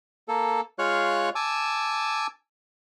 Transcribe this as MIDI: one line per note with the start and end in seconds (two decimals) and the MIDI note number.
0.28 0.61 58
0.28 0.61 69
0.79 1.29 56
0.79 1.29 65
0.79 1.29 73
0.79 1.29 77
0.79 1.29 85
0.79 1.29 90
1.35 2.27 80
1.35 2.27 81
1.35 2.27 86
1.35 2.27 88